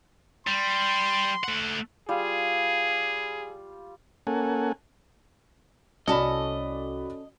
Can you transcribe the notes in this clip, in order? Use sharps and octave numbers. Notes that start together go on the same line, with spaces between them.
G3 C6
A3 F#5
G3 F4 G#4
A#3 C#4 A4 F#5 G#5
C2 C#4 E4 F#4 A4 D5 D#5 B5